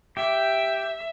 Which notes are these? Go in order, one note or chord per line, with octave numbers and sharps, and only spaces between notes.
G4 E5